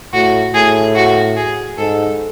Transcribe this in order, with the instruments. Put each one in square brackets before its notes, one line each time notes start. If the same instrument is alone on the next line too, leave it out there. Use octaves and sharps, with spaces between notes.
[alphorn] A2 [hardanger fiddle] F#4
[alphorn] A2 [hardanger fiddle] G#4
[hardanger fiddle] F#4
G#4
[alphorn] G#2 [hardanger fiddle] A4